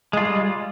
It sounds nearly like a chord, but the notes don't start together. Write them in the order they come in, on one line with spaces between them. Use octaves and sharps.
G#3 F4 G3